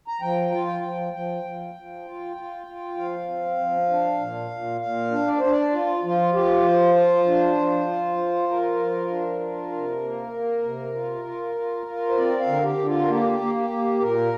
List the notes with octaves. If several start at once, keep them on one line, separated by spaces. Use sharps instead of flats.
A#5
F3 G5
F4
G5
F3
F3 G5
F3
F3
F4
F4
F4
F3 F5
C4
F3
D4
A#2
A#2
A#2 F5
D4
D5
D4 C5
D5
F4
F3 F4
F4 G4
F3 C5
F4
D4
F3
F4
F3
F4 A#4
F3
D4
F4
C3
A#3
A#3
C3
F4
F4
F4
F4
C5
C4 D5
F5
D3
A#4
G4
D3
F4
A#4
A#3 G4
A#3
G4
A#3
A#2 A#4